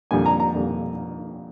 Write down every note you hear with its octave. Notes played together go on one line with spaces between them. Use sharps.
F2 D3 G3 A#3 G#5
A#5
A#5
F2 D3 G3 A#3